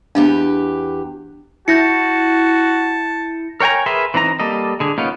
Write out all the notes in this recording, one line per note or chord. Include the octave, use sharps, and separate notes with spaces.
E2 D4 G4 B4 D#5 F5
E4 F#4 A5 G6 A#6 C#7
A#4 C#5 G5 G#5 A#5
G#4 A#4 B4 E5 C6
E3 C4 D#4 A#5
G3 A#3 A4 D#5
D3 G#4
A#3 B3 C#4 D#4 F4